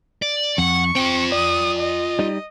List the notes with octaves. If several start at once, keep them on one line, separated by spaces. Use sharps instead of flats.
D5
F2 F#5 C#6
C4 F4 G5
D5 D#6
D#5
G3 D#4